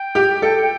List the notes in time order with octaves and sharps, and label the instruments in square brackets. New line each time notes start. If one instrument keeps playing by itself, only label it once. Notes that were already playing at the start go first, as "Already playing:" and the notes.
Already playing: [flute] G5
[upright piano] G4
A4